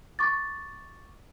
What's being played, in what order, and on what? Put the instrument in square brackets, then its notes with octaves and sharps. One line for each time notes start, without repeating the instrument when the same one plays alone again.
[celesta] C#6 D6 A6